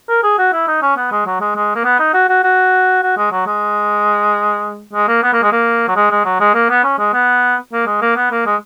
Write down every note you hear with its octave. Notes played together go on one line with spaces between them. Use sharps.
A#4
G#4
F#4
E4
D#4
C#4
B3
G#3
F#3
G#3
G#3
A#3
B3
D#4
F#4
F#4
F#4
F#4
G#3
F#3
G#3
G#3
A#3
B3
A#3
G#3
A#3
F#3
G#3
G#3
F#3
G#3
A#3
B3
C#4
G#3
B3
A#3
G#3
A#3
B3
A#3
G#3